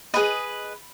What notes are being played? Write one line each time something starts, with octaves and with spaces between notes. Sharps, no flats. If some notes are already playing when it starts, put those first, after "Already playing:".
G#4 B4 D#5 B5